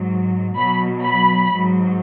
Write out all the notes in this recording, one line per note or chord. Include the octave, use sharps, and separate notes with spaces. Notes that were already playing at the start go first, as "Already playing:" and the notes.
Already playing: G#2 F#3
B2 F#3 B5
B5
G#2 F#3